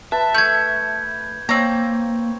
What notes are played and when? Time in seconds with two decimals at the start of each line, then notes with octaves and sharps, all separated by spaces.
0.12 B4 E5 A5
0.35 A3 G6 G#6
1.49 A#3 C4 C#5 A#5